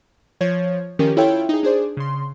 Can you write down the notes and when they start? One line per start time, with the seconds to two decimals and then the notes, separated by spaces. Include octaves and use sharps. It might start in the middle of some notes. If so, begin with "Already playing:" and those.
0.41 F3 C#5 G#6
0.99 D#3 F3 C#4 G4 A#4
1.17 E4 F4 A4 C#5 E5 G5
1.49 D#4 G#4
1.63 D4 G#4 C5 D5
1.97 C#3 C6